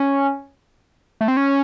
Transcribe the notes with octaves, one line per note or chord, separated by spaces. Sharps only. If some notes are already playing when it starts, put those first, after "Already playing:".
Already playing: C#4
A3
C4
C#4